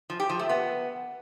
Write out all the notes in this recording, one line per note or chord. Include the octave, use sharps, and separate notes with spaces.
F3
G4
F3
A3
B3